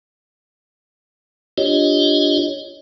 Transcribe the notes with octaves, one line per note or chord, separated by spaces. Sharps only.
D4 F4 G4 C#5 D#5